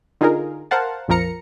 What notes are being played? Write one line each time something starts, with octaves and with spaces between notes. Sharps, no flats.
D3 D#4 F4 G#4 A#4
A#4 C5 F5 F#5 A5
A#1 F2 F3 A#4 A#5 C#7